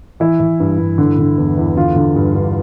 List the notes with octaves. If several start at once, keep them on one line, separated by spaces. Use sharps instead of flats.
E3 E4
E3
G2
G2
D3
D3
E2
E2
D3 F4
D3
G2
G2